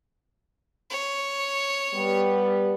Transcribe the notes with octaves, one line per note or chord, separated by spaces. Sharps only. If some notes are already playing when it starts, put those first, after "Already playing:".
C#5
G3 B3